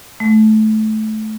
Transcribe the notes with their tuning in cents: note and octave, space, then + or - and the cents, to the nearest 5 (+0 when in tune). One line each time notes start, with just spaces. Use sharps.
A3 -20